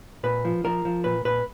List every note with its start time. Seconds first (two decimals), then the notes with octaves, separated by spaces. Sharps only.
0.23 A#2 B4
0.45 F3
0.65 F3 A#4
0.85 F3
1.04 A#2 B4
1.25 A#2 B4